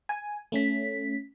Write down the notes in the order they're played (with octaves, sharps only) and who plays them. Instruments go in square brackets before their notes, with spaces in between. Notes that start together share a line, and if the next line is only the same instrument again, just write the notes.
[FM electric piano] G#5
A3 C#4 B6